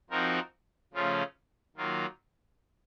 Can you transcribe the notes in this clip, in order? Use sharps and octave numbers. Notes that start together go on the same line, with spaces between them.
F3 C4 D#4 F#4 A#4
C#3 F3 A3 C#4 F4
D#3 F#3 A#3 F4